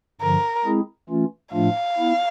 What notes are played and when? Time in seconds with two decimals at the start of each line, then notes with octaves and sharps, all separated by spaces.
0.21 G2 D3 F3 A#4
0.65 G#3 C4 E4 G#4
1.09 E3 A3 C#4 F4
1.53 A2 F3 A3 D4 F4 F5
1.98 B3 E4